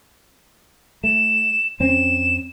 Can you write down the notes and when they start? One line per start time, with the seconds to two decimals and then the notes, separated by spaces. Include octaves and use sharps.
1.04 A3 E7
1.80 F2 C4 C#4 E7